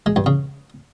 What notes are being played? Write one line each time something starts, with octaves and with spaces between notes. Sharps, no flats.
G#3
G2
C#3